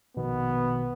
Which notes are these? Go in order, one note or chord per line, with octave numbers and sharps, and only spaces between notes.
A#1 B2 D#3 B3